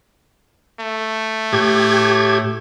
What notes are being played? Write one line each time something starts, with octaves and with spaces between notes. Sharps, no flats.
A3
A2 G4 G#6